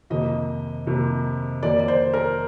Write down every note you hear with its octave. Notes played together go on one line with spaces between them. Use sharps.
F2 C3 D#3 A#3 D#5
F2 C3 D#3 A#3
F2 D#3 A#3 D5
D5
C5
A#4